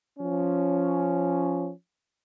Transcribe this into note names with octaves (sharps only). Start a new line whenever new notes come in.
F3 C#4